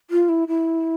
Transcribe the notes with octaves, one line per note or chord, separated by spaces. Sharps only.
F4
E4
E4